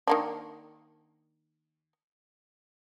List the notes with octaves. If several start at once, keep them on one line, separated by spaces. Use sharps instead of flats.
D#3 A#3 D4